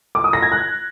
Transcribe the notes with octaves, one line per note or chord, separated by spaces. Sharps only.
D6
D#6
A#6
G#6
F#6